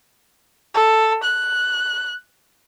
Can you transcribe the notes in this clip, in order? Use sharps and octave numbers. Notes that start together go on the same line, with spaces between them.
A4
F#6